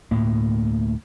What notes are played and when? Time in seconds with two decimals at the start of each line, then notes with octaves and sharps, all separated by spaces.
0.11 D2 A2 A#3